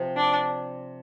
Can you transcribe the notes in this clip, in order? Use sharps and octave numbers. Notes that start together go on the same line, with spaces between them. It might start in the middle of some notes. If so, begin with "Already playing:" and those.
Already playing: C3 F3 C4
D4